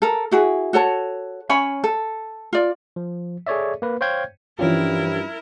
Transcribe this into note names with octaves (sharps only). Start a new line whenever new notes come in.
A4 A#4
E4 F#4 G#4
F#4 A4 C#5 A5
C#4 C#5 G#5 B5
A4
F4 D5
F3
G#4 A4 C#5 D5 E5
A#3 B4
C5 C#5 F5 G5 G6 G#6
G2 E3 F3 G3 C#4 E4 F4 A#4